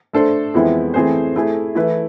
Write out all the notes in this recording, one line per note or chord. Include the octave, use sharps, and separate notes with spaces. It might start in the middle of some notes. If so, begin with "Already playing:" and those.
A3 D4 A4 C5
F2 E3 G#3 B3 E4
E3 A3 C4 G#4 C5
A3 E4 G#4
E3 A3 E4 B4